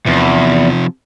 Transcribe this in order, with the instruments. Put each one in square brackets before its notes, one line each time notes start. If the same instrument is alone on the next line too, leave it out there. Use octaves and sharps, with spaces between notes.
[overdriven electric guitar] E2 [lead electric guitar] C3 F3